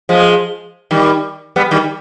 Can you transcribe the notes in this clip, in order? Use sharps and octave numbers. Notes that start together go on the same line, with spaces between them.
F3 G#3
D#3 G3
G3 B3
D#3 G3